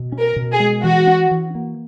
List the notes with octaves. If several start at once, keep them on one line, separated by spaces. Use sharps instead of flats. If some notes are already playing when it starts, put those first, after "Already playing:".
Already playing: B2
C#4
A#4
B2
G#4
G#3
E3 F#4
C#4
E3
A#3